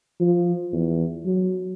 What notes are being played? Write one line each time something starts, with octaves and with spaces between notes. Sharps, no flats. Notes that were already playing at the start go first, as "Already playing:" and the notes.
F3
E2
F#3